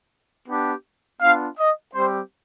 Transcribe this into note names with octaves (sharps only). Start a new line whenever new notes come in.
B3 D4 G4
B3 D4 F4 F5
D#5
G3 C4 G4 C5